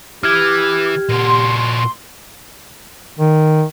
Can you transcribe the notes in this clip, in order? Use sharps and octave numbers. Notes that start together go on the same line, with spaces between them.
E3 G4 D6 F6 G#6
A#2 F#4 C6
D#3